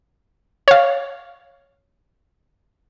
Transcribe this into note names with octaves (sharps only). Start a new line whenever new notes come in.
C#5 F5